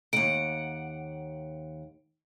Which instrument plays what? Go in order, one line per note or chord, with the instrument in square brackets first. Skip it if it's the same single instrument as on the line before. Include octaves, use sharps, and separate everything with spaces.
[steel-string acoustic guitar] D#2 F#5 [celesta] D7